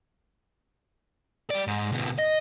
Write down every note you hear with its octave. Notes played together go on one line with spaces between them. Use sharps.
G3 D5
G#2
D2 B2
D#5